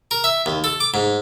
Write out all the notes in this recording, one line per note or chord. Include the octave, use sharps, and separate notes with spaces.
A#4
E5
D#2
A4
D6
G#2